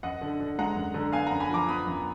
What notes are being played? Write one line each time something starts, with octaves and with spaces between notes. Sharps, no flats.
F#2 D#5 F#5
D3
D3
G#3 F#5 A#5
F#2
D3
B3 F5 G#5
F#2 F#5 A#5
G#5 B5
F3 A#5 D6
B3 B5 D#6
F#2